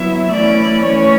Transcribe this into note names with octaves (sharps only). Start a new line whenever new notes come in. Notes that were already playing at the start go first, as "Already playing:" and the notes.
Already playing: F#3 B3 E4 E5
E3 A3 C#4 E4 D5
E3 A3 C#4 C#5